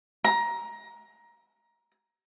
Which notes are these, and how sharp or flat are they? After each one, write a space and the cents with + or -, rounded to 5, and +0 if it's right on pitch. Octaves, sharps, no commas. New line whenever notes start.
A#5 +15